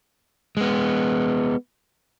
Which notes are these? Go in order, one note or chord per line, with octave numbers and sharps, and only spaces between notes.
G#3 B3